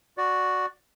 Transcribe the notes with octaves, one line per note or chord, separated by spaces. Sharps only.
F#4 D5